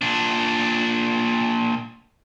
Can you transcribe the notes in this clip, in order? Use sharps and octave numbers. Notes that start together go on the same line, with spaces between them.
A#2 D4